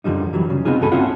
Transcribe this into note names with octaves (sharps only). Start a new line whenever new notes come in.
F#2 D3 F3 G3 D#4
E3 F#3 G3
C#3
C#3 B3 C4 D#4 F4 G#4
C#2 G2 F#4 A4 G#5 B5
A#3 C4 C#4 E4 F4 F#5